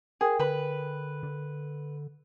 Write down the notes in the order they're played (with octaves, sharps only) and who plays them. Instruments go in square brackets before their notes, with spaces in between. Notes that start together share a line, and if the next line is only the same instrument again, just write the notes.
[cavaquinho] G#4 [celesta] A#4 G5
[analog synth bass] D3 [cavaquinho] B4 B5
[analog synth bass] D3